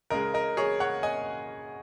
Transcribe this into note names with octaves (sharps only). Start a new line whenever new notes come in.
C#2 C#3 G#3 A#4 D#5
A#4 D#5
G#4 C#5
C#5 F#5
D#5 G#5